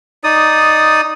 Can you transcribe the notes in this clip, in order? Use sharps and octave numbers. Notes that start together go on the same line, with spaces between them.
D#4 D5 D#6